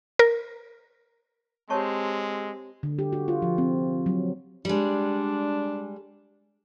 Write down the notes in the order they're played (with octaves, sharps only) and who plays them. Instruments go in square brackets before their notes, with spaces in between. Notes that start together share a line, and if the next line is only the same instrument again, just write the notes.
[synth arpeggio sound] A#4
[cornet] G#3 [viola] C4 G4 [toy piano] C#5 A5 C#6
[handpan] D3
G4
F#4
F4
F3
C4
F#3
[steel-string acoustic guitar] G3 G#3 [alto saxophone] D4